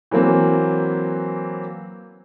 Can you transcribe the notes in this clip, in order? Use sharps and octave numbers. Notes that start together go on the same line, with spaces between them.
E3 F#3 A#3 C4